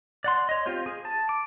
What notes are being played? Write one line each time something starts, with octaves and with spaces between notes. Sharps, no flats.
D5 F#5 C6
C#5 D#5
C4 F4 G4 C5
G#4
A5
D6